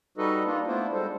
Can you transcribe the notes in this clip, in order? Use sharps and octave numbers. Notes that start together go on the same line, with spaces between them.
G3 D#4 F#4 A4 B4 D#5
A#3 D4 D#4 F4
A3 B3 D4 E4 F4 C5
G3 G#3 A4 C5